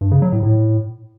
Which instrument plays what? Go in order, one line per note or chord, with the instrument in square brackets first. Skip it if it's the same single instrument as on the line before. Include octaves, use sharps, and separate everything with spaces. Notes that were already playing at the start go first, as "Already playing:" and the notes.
[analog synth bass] G2
C#3
F#3
A2
A2